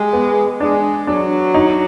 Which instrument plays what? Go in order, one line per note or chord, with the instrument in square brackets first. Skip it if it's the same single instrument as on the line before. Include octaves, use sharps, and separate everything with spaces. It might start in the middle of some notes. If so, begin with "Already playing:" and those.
Already playing: [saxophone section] G#3 [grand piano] G4
[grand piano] B3
[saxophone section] G#3 [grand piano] D4
[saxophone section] F#3 [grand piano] D4
[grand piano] D#4